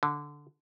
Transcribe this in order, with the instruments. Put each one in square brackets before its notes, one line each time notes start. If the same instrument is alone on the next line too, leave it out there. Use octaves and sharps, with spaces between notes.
[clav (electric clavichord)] D3